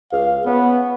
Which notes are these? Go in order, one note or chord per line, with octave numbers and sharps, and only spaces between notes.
C#2 F5
B3 C#4